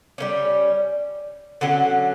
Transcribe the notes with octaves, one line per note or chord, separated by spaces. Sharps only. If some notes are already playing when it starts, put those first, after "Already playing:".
G3 A#3 C#4
D3 F#3 C#4